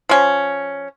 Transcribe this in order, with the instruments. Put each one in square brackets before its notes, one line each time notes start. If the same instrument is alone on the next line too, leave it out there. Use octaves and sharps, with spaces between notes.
[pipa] F3 C#4